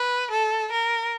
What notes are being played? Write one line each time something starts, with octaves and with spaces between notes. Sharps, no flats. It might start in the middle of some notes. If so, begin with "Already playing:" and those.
Already playing: B4
A4
A#4